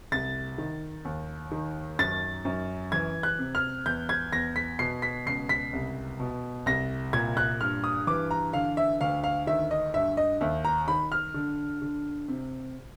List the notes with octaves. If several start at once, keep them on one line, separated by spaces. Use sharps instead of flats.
C2 A6
D#3
D#2
D#3
F#2 A6
F#2
E3 G#6
F#6
C3
F6
E2 G6
G#6
E2 A#6
B6
B2 C7
B6
C#2 C7
B6
C2
B2
C2 A#6
A#2 G#6
F#6
G2 F6
D#6
E3 D6
A#5
D3 F5
E5
D2 F5
F5
D#3 E5
D#5
G2 E5
D#5
D#2 E5
A#5
D#3 B5
F6
D3
D3
C3